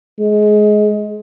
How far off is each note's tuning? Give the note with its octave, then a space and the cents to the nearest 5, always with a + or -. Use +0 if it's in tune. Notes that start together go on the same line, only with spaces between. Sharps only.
G#3 +20